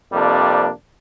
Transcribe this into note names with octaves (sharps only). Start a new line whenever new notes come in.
F2 C3 G3 A#3 D4